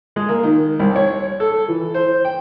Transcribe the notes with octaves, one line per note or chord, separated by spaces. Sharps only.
G#3
A#3
D#3
C2
C#5
A4
E3
C5
G5